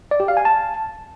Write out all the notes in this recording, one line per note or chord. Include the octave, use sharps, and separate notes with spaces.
D5
G4
F5
G#5
A5